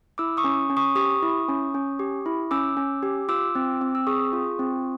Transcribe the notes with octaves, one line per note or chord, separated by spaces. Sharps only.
E4 D6 E6
C#6 D#6
C#4
C#4
C#6 D#6
G4 C#6 D#6
E4
C#4
C#4
G4
E4
C#4 D6 E6
C#4
G4
F4 D6 E6
C4
C4
E6
G#4 C#6 D#6
F4
C4